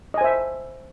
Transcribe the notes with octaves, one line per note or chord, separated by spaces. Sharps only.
C5 D#5 E5 G#5